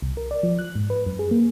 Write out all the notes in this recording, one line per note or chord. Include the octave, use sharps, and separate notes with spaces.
C2
A#4
D5
F3
F#6
G#2
B4
F#2
G#4
A#3